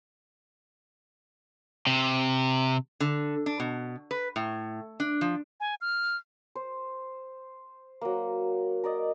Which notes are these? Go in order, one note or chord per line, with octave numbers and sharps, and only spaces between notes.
C3
D3
D4
B2
B4
A2
D4
F3
G#5
F6
C5
F#3 A#3
A#4 D5 D#5